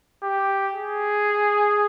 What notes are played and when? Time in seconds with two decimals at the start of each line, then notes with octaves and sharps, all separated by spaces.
0.23 G4
0.74 G#4